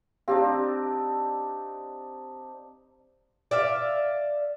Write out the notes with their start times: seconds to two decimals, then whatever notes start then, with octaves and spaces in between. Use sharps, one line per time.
0.28 C4 D4 D#4 G4 F5
3.51 D5 E5 F5